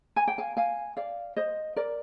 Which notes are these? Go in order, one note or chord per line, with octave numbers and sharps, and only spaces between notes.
G#5
G5
F5 G#5
F5 G#5
D5 F5
C5 D#5
A#4 D5